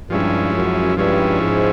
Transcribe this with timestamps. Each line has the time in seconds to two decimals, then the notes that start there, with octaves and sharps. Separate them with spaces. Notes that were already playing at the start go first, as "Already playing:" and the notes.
0.10 G2 F3 G#3 C#4 E4
0.54 F#2
0.97 G2 F3 G#3 C#4 E4
1.40 G#2